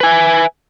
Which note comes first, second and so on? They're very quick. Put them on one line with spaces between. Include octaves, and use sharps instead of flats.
B4 G#5 E5